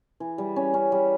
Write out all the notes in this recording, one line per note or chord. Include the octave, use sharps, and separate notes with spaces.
E3
G3
C#4
C#4
G3